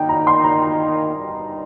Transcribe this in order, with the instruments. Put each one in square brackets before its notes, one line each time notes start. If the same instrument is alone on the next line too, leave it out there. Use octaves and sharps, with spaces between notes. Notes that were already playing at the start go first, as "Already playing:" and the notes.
Already playing: [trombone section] D#3 A#3 D#4 [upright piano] G5
[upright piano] A#5
C6
A#5
[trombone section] G2 G3 D#4